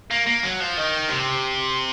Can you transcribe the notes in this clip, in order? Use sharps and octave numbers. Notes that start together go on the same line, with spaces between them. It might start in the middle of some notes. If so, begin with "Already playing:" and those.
A#3
A#3
F#3
F3
D#3
C3